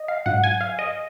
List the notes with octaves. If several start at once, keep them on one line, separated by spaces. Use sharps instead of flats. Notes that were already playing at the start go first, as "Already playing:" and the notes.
Already playing: D#5
F5
G#2 F#3 F#5
G#5
F5
D#5